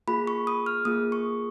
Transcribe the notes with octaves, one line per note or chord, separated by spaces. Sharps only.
A#3 F4 G#4 B5
C#6
D#6
F6
A#3 F4 G#4 D#6
C#6